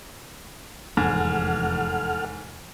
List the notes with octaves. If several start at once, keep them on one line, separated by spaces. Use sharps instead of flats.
F1 E2 G#2 A4 F#5 F6